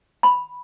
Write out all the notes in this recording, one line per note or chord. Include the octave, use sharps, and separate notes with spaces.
B5